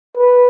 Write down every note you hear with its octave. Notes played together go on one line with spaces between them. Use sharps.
B4